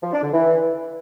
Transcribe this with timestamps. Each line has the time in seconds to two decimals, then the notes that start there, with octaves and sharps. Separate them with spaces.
0.03 F3
0.13 D4
0.23 D3
0.33 E3